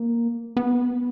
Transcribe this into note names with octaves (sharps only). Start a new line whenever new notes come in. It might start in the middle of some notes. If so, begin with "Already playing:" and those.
Already playing: A#3
B3